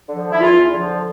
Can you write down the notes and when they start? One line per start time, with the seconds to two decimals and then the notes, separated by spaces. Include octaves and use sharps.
0.09 D3 F3
0.32 E4
0.40 E2 F4
0.72 D3 F3